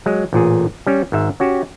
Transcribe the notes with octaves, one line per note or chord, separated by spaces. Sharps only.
F#3 G#3
A1 A#2 G#4
G3 C#4
G#1 G#2 E5
C#4 F#4 G4